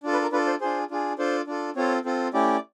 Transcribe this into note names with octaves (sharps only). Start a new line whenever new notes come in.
D4 F4 A4
B4
A#4
D4 F4 A4 B4
C5
D4 F4 G#4 C5
D4 F4 G#4
D4 F4 A4 C5
D4 F4 A4
C4 F4 A4 C#5
C4 F4 A4
A3 C#4 E4 G4 D5